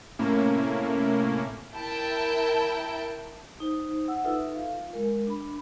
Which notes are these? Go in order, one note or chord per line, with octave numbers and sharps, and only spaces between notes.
A2 C3 A3 A#3 C#4 E4
E4 A#4 G5 A5
D#4 C5
F#5 E6
D#4 F4 A4 B4 E5
F4 F5
G#3 A#4
D4 B5